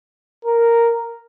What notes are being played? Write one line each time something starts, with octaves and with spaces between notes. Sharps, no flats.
A#4